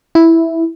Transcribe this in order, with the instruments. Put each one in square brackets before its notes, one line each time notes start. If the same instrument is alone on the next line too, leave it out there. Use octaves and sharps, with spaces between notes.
[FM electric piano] E4